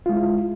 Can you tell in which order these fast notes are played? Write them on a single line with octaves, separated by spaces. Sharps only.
F4 G#3 E4